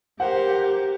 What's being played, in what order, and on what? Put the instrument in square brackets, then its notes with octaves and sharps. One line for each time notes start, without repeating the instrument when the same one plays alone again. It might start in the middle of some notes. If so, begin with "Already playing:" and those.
[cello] G4 [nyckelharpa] A#4 C5 [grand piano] F#5